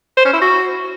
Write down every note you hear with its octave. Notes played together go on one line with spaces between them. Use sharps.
C5
C#4
E4
F#4